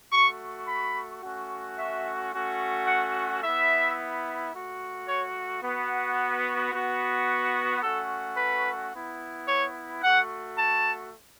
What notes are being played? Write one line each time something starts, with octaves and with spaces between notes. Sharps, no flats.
A3 F#4 C#6
B5
A3 C#4 F#4
E5
A3 C#4 F#4
F#5
B3 E4 E5
A3 F#4
C#5
B3 F#4
B3 F#4
A3 C#4 F#4 A4
B4
B3 E4
C#5
A3 F#4 F#5
A5